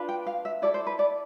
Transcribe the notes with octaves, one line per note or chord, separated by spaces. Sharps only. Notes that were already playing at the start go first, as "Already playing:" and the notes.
Already playing: D4 F4 B4
G5
F5
E5
E4 A4 D5
C5
B4
D5